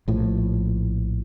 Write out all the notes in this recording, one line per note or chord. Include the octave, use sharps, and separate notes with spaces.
A#1 A2 F3